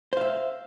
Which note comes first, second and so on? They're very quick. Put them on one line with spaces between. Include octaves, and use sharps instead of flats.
C5 F5 E5